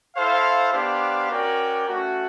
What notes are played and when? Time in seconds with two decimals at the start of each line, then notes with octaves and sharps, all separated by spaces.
0.16 E4 A4 C5 F5
0.72 B3 D4 G4 C5 F5
1.30 C#4 F#4 A#4 D5 G5
1.87 A3 C#4 F#4